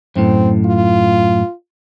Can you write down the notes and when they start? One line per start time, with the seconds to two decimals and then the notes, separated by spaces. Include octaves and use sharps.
0.16 F#2 A2 C4
0.65 F4